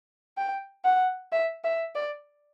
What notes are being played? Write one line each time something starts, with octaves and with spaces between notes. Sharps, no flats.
G5
F#5
E5
E5
D5